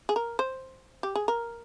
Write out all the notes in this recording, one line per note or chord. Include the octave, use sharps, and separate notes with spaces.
G#4
A#4
C5
G4
G#4
A#4